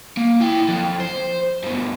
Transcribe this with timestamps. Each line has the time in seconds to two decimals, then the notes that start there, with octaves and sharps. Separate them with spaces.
0.17 A#3
0.40 E4 G5
0.68 F3 A4
1.00 C5
1.63 G2 B2